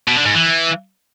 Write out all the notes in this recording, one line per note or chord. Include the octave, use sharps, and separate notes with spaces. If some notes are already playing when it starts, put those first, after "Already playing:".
B2
D3
G#2
E3